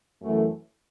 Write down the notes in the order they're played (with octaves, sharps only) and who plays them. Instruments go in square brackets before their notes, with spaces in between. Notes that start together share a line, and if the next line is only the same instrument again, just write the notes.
[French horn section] F#2 E3 A3